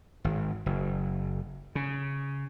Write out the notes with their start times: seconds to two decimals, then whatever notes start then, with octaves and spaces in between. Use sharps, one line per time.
0.24 G#1
0.66 F#1
1.75 C#3